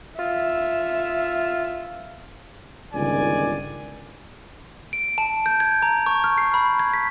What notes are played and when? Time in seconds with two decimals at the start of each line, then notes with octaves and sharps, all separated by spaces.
0.19 F4 E5
2.94 G1 C#2 D#3 D5 G#5
4.93 D7
5.18 A5
5.46 G6
5.60 G#6
5.82 A#5
6.06 C#6
6.24 F6
6.38 C7
6.54 B5
6.80 G#6
6.94 B6